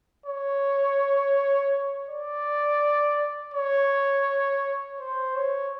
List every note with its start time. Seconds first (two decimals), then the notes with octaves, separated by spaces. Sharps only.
0.26 C#5
2.09 D5
3.54 C#5
5.00 C5
5.36 C#5